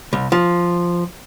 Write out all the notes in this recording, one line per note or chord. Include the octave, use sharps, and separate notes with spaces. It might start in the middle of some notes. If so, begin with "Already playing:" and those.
C2
F3